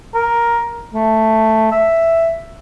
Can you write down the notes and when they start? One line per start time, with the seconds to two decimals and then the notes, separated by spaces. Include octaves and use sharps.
0.15 A#4
0.94 A3
1.71 E5